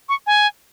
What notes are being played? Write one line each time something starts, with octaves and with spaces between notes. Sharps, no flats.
C#6
G#5